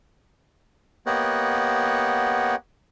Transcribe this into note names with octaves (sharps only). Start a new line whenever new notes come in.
A#3 B3 G4 C#5 D#5 F#5